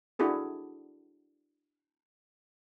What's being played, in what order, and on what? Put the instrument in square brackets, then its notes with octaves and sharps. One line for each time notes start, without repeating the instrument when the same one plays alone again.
[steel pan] D4 E4 F#4 G#4 A4